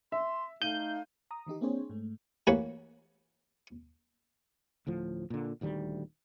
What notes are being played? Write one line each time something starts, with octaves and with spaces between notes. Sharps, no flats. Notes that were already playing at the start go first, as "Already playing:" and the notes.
E5 C6
A3 D#4 F5 G6 D#7
A#5 D#6
D#3 E3 D#4 G4
A#3 C4 D4 G#4 C5 C#5
G#2 A3
A1 A#3 F#4 B4 C#5 G#5
D2 A2 F3
A#2 D3
D#1 D2 D#3 G3